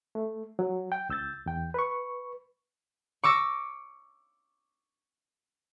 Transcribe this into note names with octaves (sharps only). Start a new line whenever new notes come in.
A3
F#3
G5
C#2 E6 G6 A6
E2 G5
B4 C#6
C#6 D6 E6 A#6